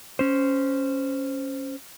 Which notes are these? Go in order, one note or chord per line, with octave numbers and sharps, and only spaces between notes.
C#4 C5